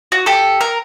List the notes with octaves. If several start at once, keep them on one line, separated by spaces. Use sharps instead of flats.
F#4
G4 A4
A#4